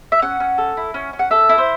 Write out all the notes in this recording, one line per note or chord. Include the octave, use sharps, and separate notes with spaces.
E5
C#4 F#5
C#4
A4
E4
C#4
C#4
F#5
A4 E5
E4
C5